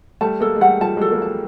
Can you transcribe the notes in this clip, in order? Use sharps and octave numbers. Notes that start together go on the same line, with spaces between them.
G3 A3 A5
G#3 A#3 A4
G#3
G3 A3 F#5
F3 G3 A5
F#3 G#3 A4
G#3 A#3
A5